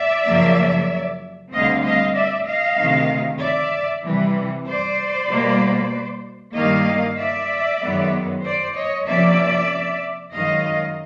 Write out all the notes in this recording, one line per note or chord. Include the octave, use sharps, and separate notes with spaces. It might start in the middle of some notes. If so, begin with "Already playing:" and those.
Already playing: D5 E5
F#2 C#3 F3 A#3
D2 D3 G3 C4 D#5 F5
D#5 F5
D5 E5
D#5 F5
D2 C3 D#3
D5 E5
C3 E3 G3
C5 D5
B2 G3 A#3
G2 D#3 G3 A#3 D#5 F5
D5 E5
F#2 D#3 G#3 B3
C5 D5
C#5 D#5
C3 F3 A#3 C#4 D5 E5
F#2 D#3 G#3 D#5 F5